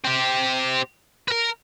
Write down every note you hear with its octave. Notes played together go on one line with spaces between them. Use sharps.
C4 G4
A#4 B4